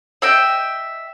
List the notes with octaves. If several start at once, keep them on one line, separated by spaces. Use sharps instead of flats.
D#5 E5 G5